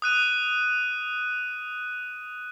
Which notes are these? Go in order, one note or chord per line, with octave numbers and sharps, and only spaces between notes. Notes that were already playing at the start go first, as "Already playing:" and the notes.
D#6 F#6 D#7